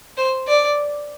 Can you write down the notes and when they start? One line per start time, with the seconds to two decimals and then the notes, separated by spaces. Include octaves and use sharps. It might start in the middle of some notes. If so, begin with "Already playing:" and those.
0.17 C5
0.48 D5